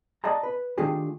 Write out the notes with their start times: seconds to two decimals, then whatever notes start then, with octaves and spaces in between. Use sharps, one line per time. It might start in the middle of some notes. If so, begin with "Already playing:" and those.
0.24 D5 D#5 A5 A#5
0.43 B4
0.78 D#3 A3 D4 F4 G4 G#4